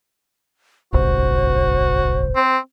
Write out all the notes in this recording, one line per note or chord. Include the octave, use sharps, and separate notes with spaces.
D1 G1 C2 F#4 C5
C4